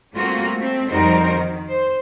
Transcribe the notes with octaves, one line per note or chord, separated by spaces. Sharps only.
G3 A3 A#3 C4 F4 F#4
A3 C4
F2 G3 D#4 F#4 A#4 C5
D#3
C5